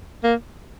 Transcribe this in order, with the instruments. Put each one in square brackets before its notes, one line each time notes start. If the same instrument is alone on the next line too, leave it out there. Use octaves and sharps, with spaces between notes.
[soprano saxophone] A#3